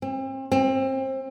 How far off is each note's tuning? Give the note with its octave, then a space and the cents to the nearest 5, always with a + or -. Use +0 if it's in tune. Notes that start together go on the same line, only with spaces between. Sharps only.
C4 +35
C4 +30